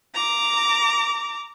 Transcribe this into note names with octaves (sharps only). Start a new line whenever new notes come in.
A#5 D6